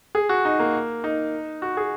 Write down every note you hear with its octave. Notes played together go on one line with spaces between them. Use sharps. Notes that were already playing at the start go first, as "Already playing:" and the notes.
G#4
F#4
D#4
A#3
D#4
F#4
G#4